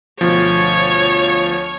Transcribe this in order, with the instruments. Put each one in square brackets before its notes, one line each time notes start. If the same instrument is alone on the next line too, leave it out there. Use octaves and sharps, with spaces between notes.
[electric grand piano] D2 B2 F3 [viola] C#5